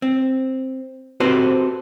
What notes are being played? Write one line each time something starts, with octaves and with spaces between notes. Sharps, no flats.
C4
C4 F#4 G4 A4 B4 C5